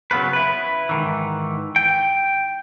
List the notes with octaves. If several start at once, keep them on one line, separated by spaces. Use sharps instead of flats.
C#3 F#3 B3 F4 B4
E4 B4
G#2 D#3 E3
G5